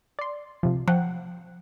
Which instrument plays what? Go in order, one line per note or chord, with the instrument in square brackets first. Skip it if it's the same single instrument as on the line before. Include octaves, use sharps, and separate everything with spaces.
[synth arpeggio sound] D5 C6
C3 F3
[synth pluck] F3 [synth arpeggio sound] F#5 G5